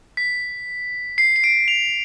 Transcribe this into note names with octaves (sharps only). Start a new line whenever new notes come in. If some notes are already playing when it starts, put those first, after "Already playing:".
B6
C7
C7
D7
F7